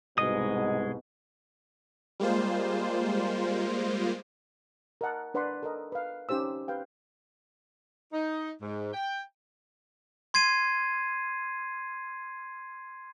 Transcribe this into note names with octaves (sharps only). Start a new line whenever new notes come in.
C2 G#2 B2 G#3 D#5 D#6
G3 G#3 A#3 F4 C5
A#4 D#5 F#5 A5
D4 B4 D5 F#5 B5 C6
A4 A#4 D#5
B4 F5
C#4 D#4 G4 C5 E6
G4 B4 F5 G5
D#4
G#2
G5
C6 G#6 C7 D#7